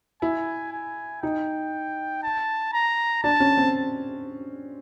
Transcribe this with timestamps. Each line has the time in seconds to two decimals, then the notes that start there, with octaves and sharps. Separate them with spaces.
0.22 E4 G#5
0.73 G#5
1.22 D#4 G5
2.23 A5
2.73 A#5
3.24 D4 A5
3.40 C#4
3.57 C4